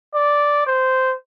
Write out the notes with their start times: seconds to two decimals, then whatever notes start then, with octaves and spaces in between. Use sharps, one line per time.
0.14 D5
0.66 C5